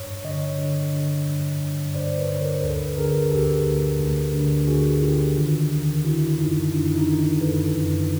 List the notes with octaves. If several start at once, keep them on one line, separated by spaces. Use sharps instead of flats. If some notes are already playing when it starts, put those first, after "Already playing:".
Already playing: G2 C#5
D3 C#5 D#5
D3
D3
G2
G2
G2 C5 D5
B4 C#5
D3
A#4 C5
D2 A4 B4
D3 G#4 A#4
D2 G4 A4
D2
D2
D3
D2 F#4 G#4
D3 F4 G4
D#3
D#3
D#3 E4 F#4
F#2 D#4 F4
F#2 D4 E4
D#4 F4
D#3
D#4 F4
F#2 A4 B4
F#2